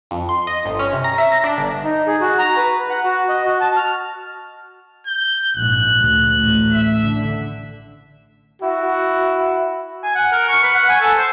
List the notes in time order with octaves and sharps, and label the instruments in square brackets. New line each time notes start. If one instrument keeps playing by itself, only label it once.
[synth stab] F2
C6
D#5
G1
C#4
C3
A#5
E5
A#6
D4
G1
[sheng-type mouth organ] D#4
G#4
F#4
A#5
B4
F#5
F#4
D#5
F#4
A5
F6
[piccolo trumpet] G6
[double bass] A#1 G#2 [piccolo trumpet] F#6
[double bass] D2
A1 A3
[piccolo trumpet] E5
[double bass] D3
[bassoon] E4 [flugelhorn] F#4
[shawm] G#5
F#5
A#4
C#6
B4
F#5
G#5
A4
C5